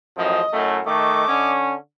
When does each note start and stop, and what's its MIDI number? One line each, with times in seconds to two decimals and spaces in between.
0.18 0.41 33
0.18 0.41 42
0.18 0.41 53
0.18 0.70 75
0.54 0.80 42
0.54 0.80 45
0.54 0.80 57
0.86 1.27 51
0.86 1.27 57
0.86 1.52 75
0.86 1.52 85
0.86 1.52 86
1.28 1.75 50
1.28 1.75 61